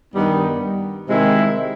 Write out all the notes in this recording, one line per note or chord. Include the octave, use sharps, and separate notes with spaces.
G2 D#3 G3 B3 D#4
C3 D#3 G#3 C4 E4